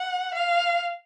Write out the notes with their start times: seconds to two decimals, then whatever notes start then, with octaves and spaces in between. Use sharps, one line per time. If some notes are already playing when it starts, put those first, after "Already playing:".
Already playing: F#5
0.34 F5